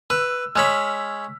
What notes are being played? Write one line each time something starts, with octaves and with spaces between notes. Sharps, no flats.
B4 E6
G#3 C#5 B5 E6 F6 B6